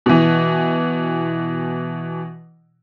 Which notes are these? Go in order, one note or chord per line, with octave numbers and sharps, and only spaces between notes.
B2 E3